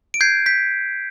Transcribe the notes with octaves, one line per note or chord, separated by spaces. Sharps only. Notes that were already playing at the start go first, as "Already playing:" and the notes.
D7
G6 G#6 C7
G6 B6